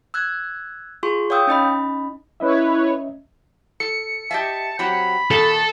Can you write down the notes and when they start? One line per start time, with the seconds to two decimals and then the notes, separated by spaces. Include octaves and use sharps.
0.14 E6 F#6 G#6
1.03 F4 G#4 C6 C#6
1.30 C#5 F5 G5 D#6 E6 G6
1.47 C#4 D#4 D#5 B5
2.40 C#4 E4 B4 C#5 D#5 E5
3.80 A4 C#7
4.31 G4 D#5 E5 A5
4.79 F#3 C4 G4 B5
5.31 A#2 D#3 A4